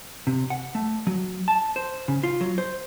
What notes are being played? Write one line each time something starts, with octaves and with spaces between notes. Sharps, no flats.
C3
F#5
A3
F#3
A5
C5
C#3
F4
F#3
C5